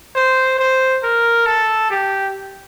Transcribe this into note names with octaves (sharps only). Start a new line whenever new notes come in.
C5
C5
A#4
A4
G4